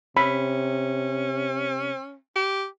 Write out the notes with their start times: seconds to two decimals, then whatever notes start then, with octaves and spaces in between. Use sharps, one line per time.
0.17 C3 C#4 B5
2.36 G4